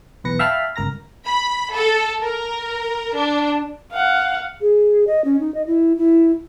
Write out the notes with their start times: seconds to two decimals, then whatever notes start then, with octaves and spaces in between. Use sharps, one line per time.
0.24 B1 E2 B4 A#6 C#7
0.39 E5 F5 G5 A5 B5 F6
0.76 G1 C#2 A#4 A#5 A#6
1.25 B5
1.73 A4
2.21 A#4
3.14 D4
3.92 F5 F#5
4.61 G#4
5.07 D#5
5.25 C#4
5.40 D#4
5.54 D#5
5.67 E4
5.98 E4